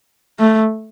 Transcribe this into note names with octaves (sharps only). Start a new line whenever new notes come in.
A3